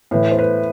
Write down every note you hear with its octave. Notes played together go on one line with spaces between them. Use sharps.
A2 E3 B4
C5
B4